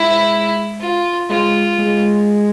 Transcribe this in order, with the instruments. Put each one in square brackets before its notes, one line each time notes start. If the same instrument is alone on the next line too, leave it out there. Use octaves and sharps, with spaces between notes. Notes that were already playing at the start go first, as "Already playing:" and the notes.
Already playing: [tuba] G#3 [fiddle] E4
[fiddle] F4
[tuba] G#3 [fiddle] F4
[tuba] G#3